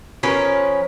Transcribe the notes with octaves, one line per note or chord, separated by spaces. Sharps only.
F3 C#4 A#4 B4